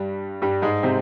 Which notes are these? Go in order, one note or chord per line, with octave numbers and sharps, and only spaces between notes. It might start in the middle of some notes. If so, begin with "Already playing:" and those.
Already playing: G2 G3
G2 G3
G#2 G#3
C3 C4